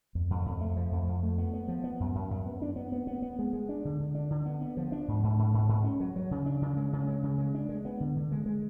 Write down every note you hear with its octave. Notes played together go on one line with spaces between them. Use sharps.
F2
F2
F2
A3
F3
F2
F2
A3
B3
B3
F3
B3
F#2
F#2
F#2
B3
D4
B3
B3
B3
B3
G#3
G#3
D4
D3
D3
D4
D3
B3
B3
F3
D4
G#2
G#2
G#2
G#2
G#2
C#4
F#3
F#3
C#3
D4
C#3
G#3
C#3
G#3
C#3
G#3
D4
G#3
B3
D3
D3
G#3
G#3